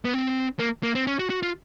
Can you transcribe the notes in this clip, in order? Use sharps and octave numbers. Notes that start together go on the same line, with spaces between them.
B3
C4
A#3
A#3
C4
C#4
F#4
F#4
F4